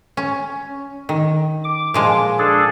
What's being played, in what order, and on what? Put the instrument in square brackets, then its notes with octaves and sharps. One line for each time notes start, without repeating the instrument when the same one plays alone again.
[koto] C#4
D#3
[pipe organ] D6
[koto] A#2 F3 G#3
[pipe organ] D4 G#4 A4